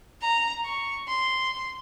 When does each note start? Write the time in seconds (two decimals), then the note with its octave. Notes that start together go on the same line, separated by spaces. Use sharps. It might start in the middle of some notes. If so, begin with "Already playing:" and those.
0.21 A#5
0.65 C#6
1.08 C6